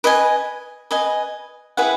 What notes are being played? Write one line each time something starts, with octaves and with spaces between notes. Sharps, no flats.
B4 D#5 G#5
B4 D#5 G#5
E4 G#4 B4 F#5